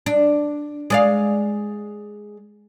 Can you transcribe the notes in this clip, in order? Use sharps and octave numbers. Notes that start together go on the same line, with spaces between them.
D4
G#3 D5 F5